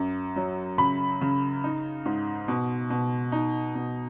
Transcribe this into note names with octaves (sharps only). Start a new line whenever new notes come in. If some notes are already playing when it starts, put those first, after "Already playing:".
Already playing: F#2
F#3
C#3 B5
C#3
D#4
G#2
B2
B2
D#4
B2